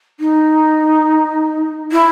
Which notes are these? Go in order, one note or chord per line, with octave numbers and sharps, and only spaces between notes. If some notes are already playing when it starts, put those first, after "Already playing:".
D#4
E4